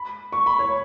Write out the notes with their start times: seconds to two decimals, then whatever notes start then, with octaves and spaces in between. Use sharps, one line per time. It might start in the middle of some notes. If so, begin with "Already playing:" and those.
Already playing: B5
0.32 C#6
0.46 B5
0.59 C#5